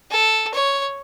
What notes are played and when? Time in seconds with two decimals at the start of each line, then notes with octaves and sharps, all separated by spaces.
0.11 A4
0.54 C#5